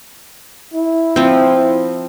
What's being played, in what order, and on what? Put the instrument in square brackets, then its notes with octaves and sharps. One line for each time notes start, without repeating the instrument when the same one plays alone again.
[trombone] E4
[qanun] F3 C4